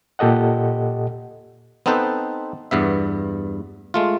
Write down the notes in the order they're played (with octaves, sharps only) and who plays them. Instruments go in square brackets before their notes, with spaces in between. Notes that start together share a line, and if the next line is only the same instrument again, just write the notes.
[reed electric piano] A#2 G4 A4 D#5 F#5
[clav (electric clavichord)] B3 C4 D#4 A4 B4 C5
E2 G2 B3 E5
G#3 A3 F4